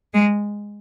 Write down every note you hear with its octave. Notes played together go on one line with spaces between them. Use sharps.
G#3